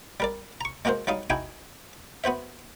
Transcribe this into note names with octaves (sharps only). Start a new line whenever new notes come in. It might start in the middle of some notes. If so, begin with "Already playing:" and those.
G3 A#4 D5
A#5 C#6
G#3 A#3 F#4 A#4 C5
F#3 G3 D#4 F5 D#6
D#4 E4 F#4 G5 G#5
B3 F#4 C5 E5